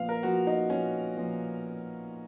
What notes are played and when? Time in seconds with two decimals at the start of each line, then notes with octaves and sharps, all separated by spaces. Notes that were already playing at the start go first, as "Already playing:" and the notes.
Already playing: A#2 F3 B3 F5
0.09 A#4
0.23 A#2 F3 B3 F#4
0.47 D#4
0.70 A#2 F3 B3 C#4
1.17 A#2 F3 B3